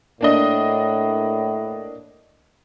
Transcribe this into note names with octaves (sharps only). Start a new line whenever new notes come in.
A2 A#3 D4 D#5